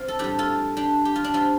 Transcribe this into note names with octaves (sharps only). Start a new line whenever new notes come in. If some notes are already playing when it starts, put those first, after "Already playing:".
Already playing: C4 F4
A4
A2 G3 D4 G4
F4 A4
D4 G4
G4
F4
D4
G3 C4 F4